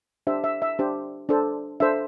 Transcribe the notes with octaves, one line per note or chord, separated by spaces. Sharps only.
D4 G4 C5 E5
E5
E5
D4 G4 C5
D4 A4 C5
D4 A4 C5 E5